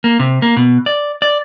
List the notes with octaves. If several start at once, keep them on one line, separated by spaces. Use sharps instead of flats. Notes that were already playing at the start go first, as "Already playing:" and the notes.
A#3
C3
A#3
B2
D5
D5